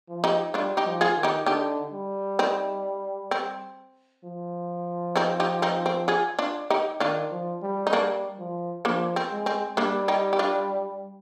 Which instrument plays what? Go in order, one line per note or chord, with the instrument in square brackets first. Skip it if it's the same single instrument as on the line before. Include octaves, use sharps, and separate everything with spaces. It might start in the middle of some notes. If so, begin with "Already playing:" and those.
[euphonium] F3
[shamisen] D#4 G4
[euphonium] G3 [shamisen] D4 F4
[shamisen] D#4 G4
[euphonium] F3
[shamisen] F4 G#4
[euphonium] D#3
[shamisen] D#4 G4
[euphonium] D3 [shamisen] D#4 G4
[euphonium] G3
[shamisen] C4 D#4
C4
[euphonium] F3
[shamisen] C4 D#4
D#4 G4
C4 D#4
C4
F4 G#4
D4 F4
D#4 G4
[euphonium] D#3 [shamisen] D4 F4
[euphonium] F3
G3
[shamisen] D#4
[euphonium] G3 [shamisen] A#3 D4
[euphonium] F3
[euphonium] F3 [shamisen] A#3 D4
[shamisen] C4
[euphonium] G#3
[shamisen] C4
[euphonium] G3 [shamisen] A#3 D4
[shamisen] D#4 G4
G4
D4 F4